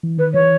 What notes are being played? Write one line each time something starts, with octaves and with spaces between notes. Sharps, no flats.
E3
D#3 B4
E3 C#5